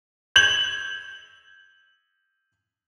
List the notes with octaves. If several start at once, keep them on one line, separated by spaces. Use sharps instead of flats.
G6 G#6 F#7